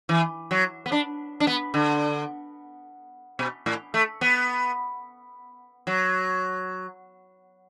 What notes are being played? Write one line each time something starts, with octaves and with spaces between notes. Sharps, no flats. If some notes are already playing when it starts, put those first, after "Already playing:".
E3
F#3
B3
D4
D4
B3
D3
B2
A2
A3
B3
F#3